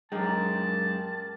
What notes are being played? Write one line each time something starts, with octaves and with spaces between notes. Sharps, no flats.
F#2 G#3 G4 A#4 G5 A5